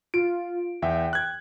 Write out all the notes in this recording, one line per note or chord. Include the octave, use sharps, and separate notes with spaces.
F4 D7
E2 E5 G5
F#6 G#6